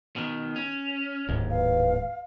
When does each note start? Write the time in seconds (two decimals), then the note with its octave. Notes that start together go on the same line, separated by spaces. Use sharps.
0.16 B2 D#3
0.56 C#4
1.29 D1 D#2 G#2 A#3
1.50 B4 F5